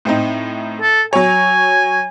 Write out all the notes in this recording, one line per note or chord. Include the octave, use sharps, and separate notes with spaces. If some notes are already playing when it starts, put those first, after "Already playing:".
A2 C4 D#4
A4
F#3 C#5 G#5